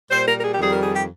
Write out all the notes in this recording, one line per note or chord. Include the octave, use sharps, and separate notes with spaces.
A#2 G3 C5
A#4
A#4
G#4
G4
F2 D#3 G3 G#4
A#4
G#4
G4